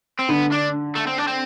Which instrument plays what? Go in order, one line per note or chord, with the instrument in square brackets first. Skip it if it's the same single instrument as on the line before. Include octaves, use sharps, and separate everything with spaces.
[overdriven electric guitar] C4
[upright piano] D3 [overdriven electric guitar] B3
[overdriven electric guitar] D4
A3
C4
D4
C4